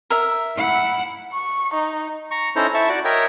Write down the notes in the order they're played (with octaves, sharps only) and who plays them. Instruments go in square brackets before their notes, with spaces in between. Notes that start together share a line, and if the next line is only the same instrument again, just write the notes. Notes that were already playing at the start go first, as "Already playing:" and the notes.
[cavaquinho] A#4 E5
[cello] E4 F#5
[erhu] C#6
D#4
[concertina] A#5 C#6
C#4 D#4 E4 A4 C5 A#5
E4 E5 A5 C#6
F#4 D5 D6
A#4 C#5 D#5 E5 G5